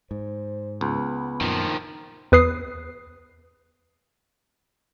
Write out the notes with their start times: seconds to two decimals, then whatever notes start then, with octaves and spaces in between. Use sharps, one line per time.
0.11 G#2 C5
0.81 C#2 B3
1.41 F#2 A#2 D#3 F3
2.32 E2 B4 D#6 C7